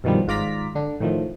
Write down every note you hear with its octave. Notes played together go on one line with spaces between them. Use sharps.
G2 B2 D#3 F3 G3
G#1 G#2 F4 D5 A#5 B6
D3 D4
A2 D#3 F3 A3